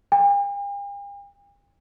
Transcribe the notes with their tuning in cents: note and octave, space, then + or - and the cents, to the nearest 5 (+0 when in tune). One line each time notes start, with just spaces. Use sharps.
G5 +45